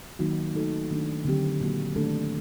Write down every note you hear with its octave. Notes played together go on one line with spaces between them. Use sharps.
D#3 F#3 A#3 D#4 F#4
A3 D#4 F#4 A4
D#3 A3 D4
D3 F#3 C4 G4
A#2 F#3 A#3 F#4
D#3 A3 D4 A4